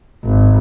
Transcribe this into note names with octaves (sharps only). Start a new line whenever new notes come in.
G#1